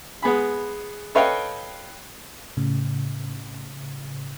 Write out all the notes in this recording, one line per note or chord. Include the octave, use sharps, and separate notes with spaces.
G#3 B3 G#4 B5
A4 B4 C#5 D#5 F5 G5
A2 C#3